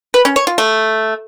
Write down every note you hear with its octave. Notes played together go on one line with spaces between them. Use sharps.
B4
C#4
C#5
F4
A3